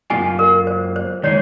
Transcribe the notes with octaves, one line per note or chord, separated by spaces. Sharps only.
F#2 D#3 A#3 F4 G#5
A#4
C5
C5
D#3 G#3 D#4 C#5